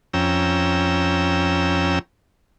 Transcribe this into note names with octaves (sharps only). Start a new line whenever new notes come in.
F2 C#4 G5 A#5 E6